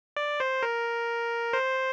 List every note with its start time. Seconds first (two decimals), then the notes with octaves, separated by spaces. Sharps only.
0.17 D5
0.40 C5
0.63 A#4
1.53 C5